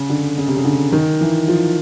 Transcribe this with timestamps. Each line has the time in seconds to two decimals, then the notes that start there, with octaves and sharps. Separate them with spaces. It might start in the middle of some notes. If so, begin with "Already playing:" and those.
Already playing: C#3
0.09 D3
0.38 C#3
0.48 C3
0.56 C#3
0.65 D3
0.92 D#3
1.21 E3
1.48 F3